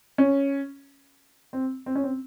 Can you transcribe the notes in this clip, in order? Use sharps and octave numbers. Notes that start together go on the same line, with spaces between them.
C#4
C4
C4
C#4
C4